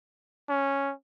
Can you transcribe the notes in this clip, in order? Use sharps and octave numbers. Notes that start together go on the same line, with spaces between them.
C#4